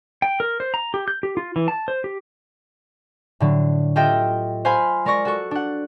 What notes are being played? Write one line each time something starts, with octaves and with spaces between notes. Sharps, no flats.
G5
A#4
C5
A#5
G4
G6
G4
F4
E3
A5
C5
G4
A2 D3 F#3
F4 G4 A4 D#5 E5 G5
C5 F5 G#5 B5 C6
G#3 A#4 D5 C#6 A#6
F#4 A4 C#6
D4 F#5